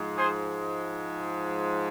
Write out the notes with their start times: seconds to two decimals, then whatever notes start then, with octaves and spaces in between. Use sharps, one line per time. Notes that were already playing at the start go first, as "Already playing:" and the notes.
Already playing: G#2 F3 G#3
0.18 G#4 C5